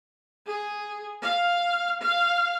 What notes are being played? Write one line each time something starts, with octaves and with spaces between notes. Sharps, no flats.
G#4
F5
F5